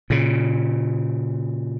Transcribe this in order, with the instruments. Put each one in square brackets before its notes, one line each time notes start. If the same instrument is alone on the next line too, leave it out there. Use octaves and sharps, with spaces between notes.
[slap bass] A#2 C#3